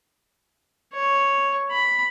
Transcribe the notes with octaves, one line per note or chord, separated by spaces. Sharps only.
C#5
B5